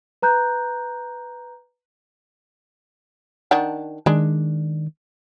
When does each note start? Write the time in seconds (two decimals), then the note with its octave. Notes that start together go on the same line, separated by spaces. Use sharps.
0.22 B4 A#5 F#6 G6
3.51 D#3 D4 F#5
4.06 D#3 G#3 D4